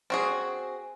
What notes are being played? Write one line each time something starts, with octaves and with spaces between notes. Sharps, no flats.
C4 F#4 G#4